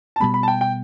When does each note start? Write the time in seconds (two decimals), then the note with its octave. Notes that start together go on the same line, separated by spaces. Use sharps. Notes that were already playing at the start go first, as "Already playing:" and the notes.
0.16 A5
0.20 B2 G3 B3 B5
0.34 B5
0.43 A5
0.48 G5
0.61 G5